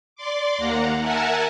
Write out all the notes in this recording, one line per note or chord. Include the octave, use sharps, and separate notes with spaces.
D5 C6 D6
D#2 A#3 F#5 A#5
A#4 E5 F#5 G#5 A5